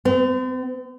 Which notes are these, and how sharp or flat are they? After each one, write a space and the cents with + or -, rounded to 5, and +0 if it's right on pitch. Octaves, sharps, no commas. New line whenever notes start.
C4 -40